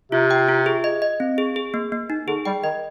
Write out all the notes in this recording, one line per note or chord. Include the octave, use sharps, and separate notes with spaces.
C3 F4
G5
F4
G#4
D#5
D#5
C4
G#4
G#4
A#3
A#3
D#4
D3 G#4
G3 G5
D#3 D#5